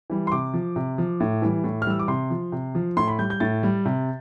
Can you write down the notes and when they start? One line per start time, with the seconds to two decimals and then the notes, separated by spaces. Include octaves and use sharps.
0.10 E3 G3
0.27 C6
0.32 C3 D6
0.54 F3
0.76 C3
0.98 F3
1.20 A2
1.42 E3 G3
1.64 A2
1.82 F6
1.86 E3 G3 E6
1.99 D6
2.08 C3 C6
2.30 F3
2.52 C3
2.75 F3
2.97 A2 C6
3.08 B5
3.18 G3 G6
3.30 G6
3.40 A2 A6
3.63 G3
3.85 C3